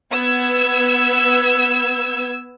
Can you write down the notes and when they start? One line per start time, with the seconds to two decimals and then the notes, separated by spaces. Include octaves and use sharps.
0.12 B3 E6 G#6